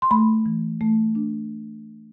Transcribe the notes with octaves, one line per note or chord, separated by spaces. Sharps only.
C6
A3 B5
E3
A3
D4